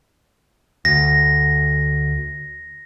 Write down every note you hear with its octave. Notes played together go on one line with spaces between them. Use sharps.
D2 A#6